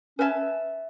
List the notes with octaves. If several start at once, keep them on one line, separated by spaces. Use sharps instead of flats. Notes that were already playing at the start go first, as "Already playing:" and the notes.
C#4 B4 E5 A5